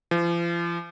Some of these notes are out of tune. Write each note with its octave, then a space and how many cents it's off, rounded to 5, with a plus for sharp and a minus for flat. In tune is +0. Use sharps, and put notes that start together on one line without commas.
F3 -40